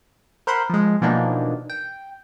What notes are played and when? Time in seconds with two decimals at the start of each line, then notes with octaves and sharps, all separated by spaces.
0.47 A#4 C5 F#5 B5 C6
0.69 F3 G#3
1.01 B2 E3 F3 A#3 D4 D#4
1.70 G5